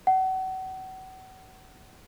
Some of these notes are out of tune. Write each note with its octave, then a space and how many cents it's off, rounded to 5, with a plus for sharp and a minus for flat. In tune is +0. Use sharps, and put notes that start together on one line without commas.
F#5 +35